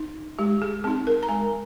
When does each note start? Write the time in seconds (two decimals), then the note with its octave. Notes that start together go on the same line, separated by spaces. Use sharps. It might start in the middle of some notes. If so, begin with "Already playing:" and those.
Already playing: D#4
0.39 G#3 G4
0.62 G#4
0.84 C4 D#4 G#4
1.07 A#4
1.23 A#5
1.29 G#3 G#5